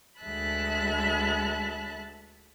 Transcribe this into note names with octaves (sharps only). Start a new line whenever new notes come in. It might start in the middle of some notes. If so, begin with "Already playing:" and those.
D2 G#3 E5 A5 B5 F#6